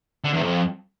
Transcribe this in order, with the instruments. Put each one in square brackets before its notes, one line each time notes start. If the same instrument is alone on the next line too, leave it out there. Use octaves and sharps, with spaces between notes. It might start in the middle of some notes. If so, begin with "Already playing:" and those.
[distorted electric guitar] D3
E2
F2